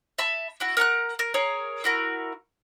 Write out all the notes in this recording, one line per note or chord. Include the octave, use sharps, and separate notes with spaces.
E5 A5 B5
E4 F#4
A#4 F#5 A#5 F#6
A#4
G#4 A#4 C#5
E4 F#4 A#4